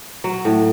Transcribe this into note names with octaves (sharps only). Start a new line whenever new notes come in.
F#3
A2